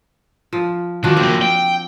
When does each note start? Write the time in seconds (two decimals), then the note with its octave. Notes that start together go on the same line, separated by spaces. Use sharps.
0.53 F3
1.04 D#3 F3 D4 F#4
1.17 F#3 A#3 C4
1.42 G5